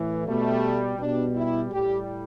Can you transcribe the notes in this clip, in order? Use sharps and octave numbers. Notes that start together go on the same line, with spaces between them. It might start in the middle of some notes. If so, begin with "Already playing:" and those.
Already playing: A2 E3
B2 G3 A3
B2 G3 D4
E4
A2 G3 G4